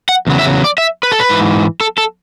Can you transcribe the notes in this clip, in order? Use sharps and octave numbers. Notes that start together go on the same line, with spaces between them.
F#5
E2 C#3 F#3
E5
D5
E5
B4
A4
B4
G#2 E3
A4
A4